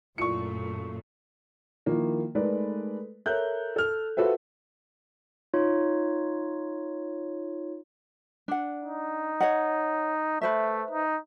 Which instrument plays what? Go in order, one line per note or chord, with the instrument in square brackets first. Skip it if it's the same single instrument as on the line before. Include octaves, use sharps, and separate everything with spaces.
[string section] F#2 A#2 A3 [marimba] E4 F4 D5 [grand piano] C#6 C#7
[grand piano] D#3 F3 A#3 E4
G#3 A3 D#4 A#4 B4 D5
A4 A#4 C#5 E5 F#6 G6
A4 F6
F4 F#4 A4 B4 C5 E5
[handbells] D#4 F4 C#5
[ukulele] D4 F#5
[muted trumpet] D#4
[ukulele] C#5 D#5 F#5
[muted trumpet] A3 [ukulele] B4 C5 E5
[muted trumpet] D#4